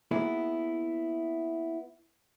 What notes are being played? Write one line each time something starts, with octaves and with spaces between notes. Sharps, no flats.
A#3 B3 D#4 E4 F#4 G#4